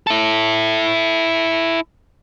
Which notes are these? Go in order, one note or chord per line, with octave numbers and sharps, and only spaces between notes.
E4 A4